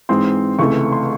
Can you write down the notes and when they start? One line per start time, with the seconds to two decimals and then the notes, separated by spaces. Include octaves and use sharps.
0.09 G#2 E3 G#3 C4 C6
0.59 C#2 C3 E3 A3 C#6
0.92 C6